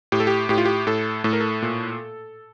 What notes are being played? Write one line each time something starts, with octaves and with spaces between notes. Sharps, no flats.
A2 G4
A4
G4
A2 G4
F4
G4
A2 A4
A2 A4
A#4
A4
A#2